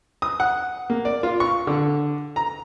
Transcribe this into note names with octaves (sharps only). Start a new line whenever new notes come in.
D#6
F#5
A#3
D5
F4
C#6
D3
A#5